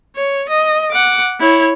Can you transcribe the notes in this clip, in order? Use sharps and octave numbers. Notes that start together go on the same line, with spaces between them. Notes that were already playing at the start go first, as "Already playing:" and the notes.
C#5
D#5
F#5 D6
E4 C#5